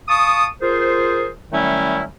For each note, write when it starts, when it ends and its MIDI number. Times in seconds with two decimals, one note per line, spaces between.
0.08 0.45 77
0.08 0.45 81
0.08 0.45 85
0.08 0.45 87
0.61 1.27 65
0.61 1.27 68
0.61 1.27 70
0.61 1.27 72
1.52 2.03 51
1.52 2.03 54
1.52 2.03 55
1.52 2.03 57
1.52 2.03 61
1.52 2.03 64